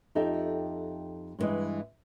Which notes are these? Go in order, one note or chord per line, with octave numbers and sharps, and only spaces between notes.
F2 D#4 G4 A4 E5 G5
G2 A#2 E3 G#3 D#5